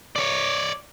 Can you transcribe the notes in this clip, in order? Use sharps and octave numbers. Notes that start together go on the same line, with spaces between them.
C#5 D5